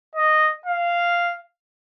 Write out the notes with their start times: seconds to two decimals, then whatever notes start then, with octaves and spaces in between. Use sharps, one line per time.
0.16 D#5
0.66 F5